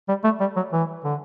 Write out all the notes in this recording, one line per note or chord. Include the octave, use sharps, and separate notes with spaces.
G3
A3
G3
F#3
E3
D3